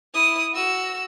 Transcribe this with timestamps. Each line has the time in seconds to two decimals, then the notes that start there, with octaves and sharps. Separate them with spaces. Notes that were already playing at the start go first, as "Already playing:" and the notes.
0.14 E4 D#6
0.54 F#4 E6